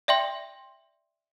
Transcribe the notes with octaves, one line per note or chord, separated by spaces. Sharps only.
D5 E5 G5 C6